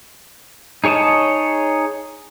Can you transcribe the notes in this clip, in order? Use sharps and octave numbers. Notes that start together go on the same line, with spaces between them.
D#4 G#4 C#5 D#5 A5